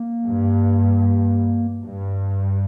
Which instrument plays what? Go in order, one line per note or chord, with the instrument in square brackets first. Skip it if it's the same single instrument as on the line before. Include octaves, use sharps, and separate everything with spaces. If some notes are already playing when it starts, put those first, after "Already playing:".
Already playing: [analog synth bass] A#3
[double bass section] G2
G2